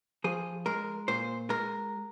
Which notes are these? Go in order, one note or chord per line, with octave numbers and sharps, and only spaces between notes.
F3 G#4
G#3 A#4
A#2 C5
G#3 A#4